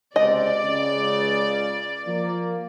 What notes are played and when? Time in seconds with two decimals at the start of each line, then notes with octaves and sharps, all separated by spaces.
0.16 C#2 C3 D5 D#5
0.62 C#2 C#3
2.06 F3 A#3